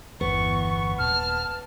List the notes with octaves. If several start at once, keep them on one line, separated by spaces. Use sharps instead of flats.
G1 E2 E3 B3 C#6
D#1 A5 F6